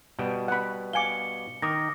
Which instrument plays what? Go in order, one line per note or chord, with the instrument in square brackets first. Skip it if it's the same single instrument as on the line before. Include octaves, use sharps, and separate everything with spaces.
[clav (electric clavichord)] B2 G3 G5
[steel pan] F#5 B5
[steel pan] F5 G#5 D6 [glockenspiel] C#7 G7
[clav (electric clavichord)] D#3 A#4 [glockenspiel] D6 D#6 A#6